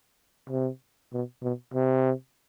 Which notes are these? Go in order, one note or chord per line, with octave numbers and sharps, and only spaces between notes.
C3
B2
B2
C3